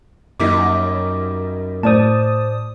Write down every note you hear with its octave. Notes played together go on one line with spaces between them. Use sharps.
F#2 G3 A#3 D#4 D6 B6
A2 C5 D5 A5 D#6